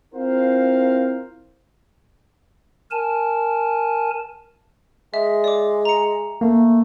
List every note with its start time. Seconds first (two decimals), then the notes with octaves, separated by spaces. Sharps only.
0.14 C4 E4 F4 A#4 C5 F5
2.91 A#4 G#5 A5
5.14 G#3 E5
5.44 D5 D6
5.85 A#5 C#7
6.41 A3 A#3